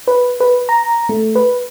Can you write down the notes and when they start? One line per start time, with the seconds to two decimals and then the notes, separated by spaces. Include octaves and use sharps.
0.08 B4
0.40 B4
0.69 A#5
1.09 A3
1.35 B4